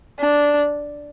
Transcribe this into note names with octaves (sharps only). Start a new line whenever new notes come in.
D4